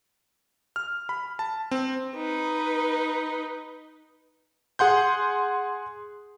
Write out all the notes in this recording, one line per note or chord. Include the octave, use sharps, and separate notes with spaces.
F6
B5
A5
C4
D#4 B4
G#4 F#5 C6 G6